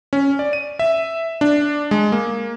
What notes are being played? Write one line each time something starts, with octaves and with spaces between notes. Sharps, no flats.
C#4
D5
D#7
E5
D4
G#3
A#3